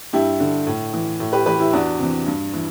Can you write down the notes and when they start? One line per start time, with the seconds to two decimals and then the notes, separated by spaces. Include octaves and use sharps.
0.13 G2 E4 G4
0.40 D3
0.67 A2
0.93 E3
1.20 A2
1.33 G4 B4
1.46 E3 G4 B4
1.60 E4 G4
1.73 E2 D4 F#4
1.99 C3 E3
2.26 G2
2.53 E3